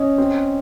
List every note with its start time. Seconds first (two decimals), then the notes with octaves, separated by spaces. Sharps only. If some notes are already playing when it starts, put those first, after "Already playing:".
Already playing: C#4 D#5
0.18 C4